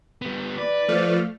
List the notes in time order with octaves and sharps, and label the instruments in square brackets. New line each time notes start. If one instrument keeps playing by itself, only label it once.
[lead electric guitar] G3 B3
[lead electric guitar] B4 [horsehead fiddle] D5
[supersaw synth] F3 A3 F6